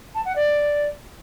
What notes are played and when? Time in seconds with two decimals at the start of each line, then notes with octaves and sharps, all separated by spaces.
0.15 A5
0.25 F#5
0.36 D5